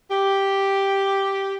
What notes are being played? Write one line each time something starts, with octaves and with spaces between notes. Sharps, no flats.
G4